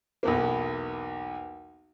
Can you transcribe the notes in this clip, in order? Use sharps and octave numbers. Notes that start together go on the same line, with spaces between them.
B1 E2 A#3